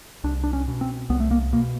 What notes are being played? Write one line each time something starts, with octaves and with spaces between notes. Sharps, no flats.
C2 D4
D4
C#4
B2
C4
C2 B3
A3
A#3
B2 A#3